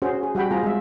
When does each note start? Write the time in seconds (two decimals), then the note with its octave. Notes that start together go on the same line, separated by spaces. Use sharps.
0.02 C#4 F#4 G#4 C5
0.23 G#4
0.35 G3 F#4 F#5 G5 B5
0.51 C4 F4 G#4 A#5
0.63 G#3 E5